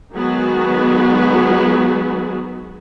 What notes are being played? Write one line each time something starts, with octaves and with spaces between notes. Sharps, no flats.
D#3 F#3 G#3 B3 F#4 G#4